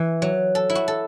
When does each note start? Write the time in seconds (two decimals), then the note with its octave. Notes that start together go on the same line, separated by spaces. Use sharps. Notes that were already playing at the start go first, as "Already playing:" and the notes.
Already playing: E3
0.22 F#3
0.55 A4
0.70 E4
0.75 F#4
0.88 A4